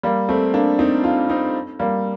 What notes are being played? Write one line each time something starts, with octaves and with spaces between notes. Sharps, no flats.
G3 A#3
A3 C4
A#3 D4
C4 D#4
D4 F4
C4 D#4
G3 A#3